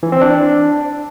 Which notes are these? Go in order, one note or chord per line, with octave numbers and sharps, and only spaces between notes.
E3
C4
D4